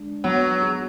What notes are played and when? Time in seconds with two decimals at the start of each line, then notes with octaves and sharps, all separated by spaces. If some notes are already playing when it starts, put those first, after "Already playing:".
Already playing: G#3 D4
0.24 F#3 B3
0.62 G#4